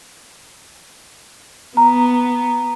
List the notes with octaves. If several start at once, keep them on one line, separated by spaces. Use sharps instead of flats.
B3 A#5